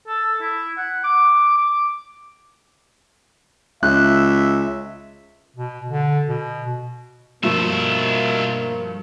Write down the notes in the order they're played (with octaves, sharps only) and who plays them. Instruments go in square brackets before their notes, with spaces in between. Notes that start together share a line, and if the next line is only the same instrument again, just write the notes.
[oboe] A4
E4
F#5
D6
D6
[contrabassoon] C#2 [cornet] E5 [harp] F#6
[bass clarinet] B2
D3
B2
[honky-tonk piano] G2 F3 A3 [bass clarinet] B2 [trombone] A#3 [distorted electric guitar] F4 E5